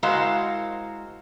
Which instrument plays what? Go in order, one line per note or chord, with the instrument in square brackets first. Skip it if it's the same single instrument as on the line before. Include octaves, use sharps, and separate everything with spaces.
[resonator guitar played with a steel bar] G#3 E4 F#4 A#4 C5 F5